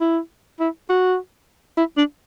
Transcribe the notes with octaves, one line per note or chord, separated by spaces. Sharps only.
E4
E4
F#4
E4
D4